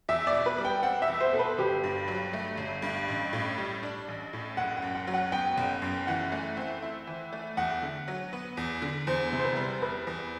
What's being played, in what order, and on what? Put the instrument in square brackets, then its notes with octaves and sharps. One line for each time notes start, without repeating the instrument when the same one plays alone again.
[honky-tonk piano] E2 [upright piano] E5
[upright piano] D5
[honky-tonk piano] B2
[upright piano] B4
[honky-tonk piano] G3
[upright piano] G5
[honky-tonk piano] C4 [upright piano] F#5
[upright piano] E5
[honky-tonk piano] E2
[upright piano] C5
[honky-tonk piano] B2 [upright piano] A4
[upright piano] B4
[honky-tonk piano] G1 [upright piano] G4
[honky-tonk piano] G2
F#3
A3
G1
G2
A1
A2
G3
D4
A1
A2
[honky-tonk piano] F#1 [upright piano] F#5
[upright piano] F#5
[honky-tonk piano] F#2
[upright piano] F#5
[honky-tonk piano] F#3
[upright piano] F#5
[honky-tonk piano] B3 [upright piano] G5
[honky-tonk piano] F#1
F#2
[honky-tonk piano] E3 [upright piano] F#5
[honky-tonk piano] A3
C4
E4
E3
A3
[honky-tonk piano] E2 [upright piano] F#5
[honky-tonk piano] D3
F#3
B3
E2
D3
[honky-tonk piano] E2 [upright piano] C5
[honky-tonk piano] C3
[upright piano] C5
B4
[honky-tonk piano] G3
[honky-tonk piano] E2 [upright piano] B4
[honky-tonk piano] E2